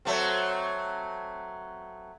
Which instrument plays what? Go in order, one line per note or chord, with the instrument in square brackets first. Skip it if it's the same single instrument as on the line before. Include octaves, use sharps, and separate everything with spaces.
[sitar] F#3 A3 C4